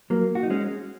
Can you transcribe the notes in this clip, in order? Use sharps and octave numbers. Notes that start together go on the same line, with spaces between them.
F#3 A#3
F#4
D#4
G#3 C#4